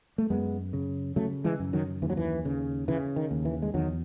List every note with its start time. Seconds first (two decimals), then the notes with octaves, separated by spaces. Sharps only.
0.18 A3
0.30 F#2 G#3 B3
0.73 C#3
1.16 C#3 F#3 A3
1.44 E3 G#3
1.59 F#2
1.73 D#3 F#3
2.02 D#2 E3
2.10 F#3
2.17 E3
2.45 C#3
2.88 C#3 E3
3.16 D#3
3.31 D#2
3.45 E3
3.62 G#3
3.74 E2 D#3 F#3